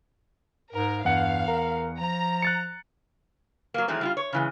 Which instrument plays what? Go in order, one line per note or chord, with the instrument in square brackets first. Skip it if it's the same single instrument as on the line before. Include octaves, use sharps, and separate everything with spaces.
[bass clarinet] G#2 [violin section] A#4
[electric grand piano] E2 F#5 C#7 [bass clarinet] G2 [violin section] F5
[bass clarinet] A#4
[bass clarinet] F3 [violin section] A#5
[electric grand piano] F#6 A6 C#7
[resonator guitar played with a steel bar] F#3 A#3
D#3 E3 F#3 G#3 A3 C4
G3 E4 F4
C#5
C#3 E3 G#3